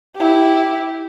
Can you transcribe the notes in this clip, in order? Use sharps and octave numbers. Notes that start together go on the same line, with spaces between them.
E4 G4